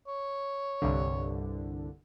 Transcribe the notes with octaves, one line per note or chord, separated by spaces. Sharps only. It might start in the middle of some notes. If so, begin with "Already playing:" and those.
C#5
C2 G2 D3